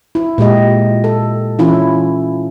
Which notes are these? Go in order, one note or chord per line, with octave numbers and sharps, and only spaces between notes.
E4
A#2 G#3 G4 D#5
A4
E3 C#4 E4 F4